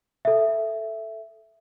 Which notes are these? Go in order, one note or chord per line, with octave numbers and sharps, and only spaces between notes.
A4 E5